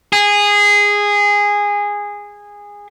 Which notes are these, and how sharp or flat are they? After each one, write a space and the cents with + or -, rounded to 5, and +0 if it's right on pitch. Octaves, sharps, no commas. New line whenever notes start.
G#4 -15